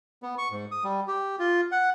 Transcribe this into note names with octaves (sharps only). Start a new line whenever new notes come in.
B3
C#6
G#2
D#6
G3
G4
F4
F#5